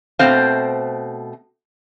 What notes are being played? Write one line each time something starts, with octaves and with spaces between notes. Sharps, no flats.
B2 A3 C4 C5 F5